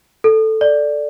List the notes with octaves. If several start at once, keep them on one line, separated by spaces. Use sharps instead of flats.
A4
D5